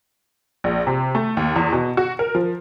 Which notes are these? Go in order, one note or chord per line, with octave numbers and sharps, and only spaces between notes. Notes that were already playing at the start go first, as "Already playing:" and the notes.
A#1
C3
A3
D#2
E2
B2
F#4
A#4
F3